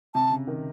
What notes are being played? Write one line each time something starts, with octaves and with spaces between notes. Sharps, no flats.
C3 A5
C#3
D#3